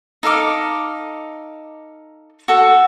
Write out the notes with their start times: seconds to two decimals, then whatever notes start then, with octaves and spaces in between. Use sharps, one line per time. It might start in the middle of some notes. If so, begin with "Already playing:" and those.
0.23 D#4 A4 F5 D6
2.48 F#4 A4